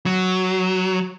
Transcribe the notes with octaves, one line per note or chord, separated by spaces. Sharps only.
F#3